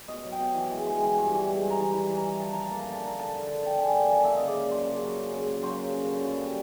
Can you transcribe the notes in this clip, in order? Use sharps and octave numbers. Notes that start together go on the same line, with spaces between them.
B2 D#5
F#3
G5
B2
E3
G#3
G#3
E3
G2
E3
G#3
G2
A#5
E3
E3 B5
E3
A#5
E3
F3 A5
F3 A#5
A#3 A5
A#5
D3
A5
D3 A#5
D3 A5
D3
D3
D3 G5
D3 G#5
A#3 G5
G#5
F3 A5
A#3 E5
C#3 D#5
D5
A#3
F#3 C5
C#3
F#3
C#3
C#3
A#3
F#3 C5
C#3
C#3
D3
F#2
G3